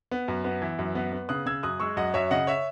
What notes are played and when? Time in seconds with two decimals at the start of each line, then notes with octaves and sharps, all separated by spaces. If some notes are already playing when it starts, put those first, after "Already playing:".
0.11 B3
0.28 F#2
0.44 B3
0.62 E3
0.79 F#2
0.95 B3
1.12 B3
1.29 C#3 D#6 F#6
1.46 C#3 E6 G#6
1.63 F#2 D#6 F#6
1.80 G#3 C#6 E6
1.97 F#2 D#5 F#5
2.14 F#2 C#5 E5
2.31 C#3 D#5 F#5
2.47 C#5 E5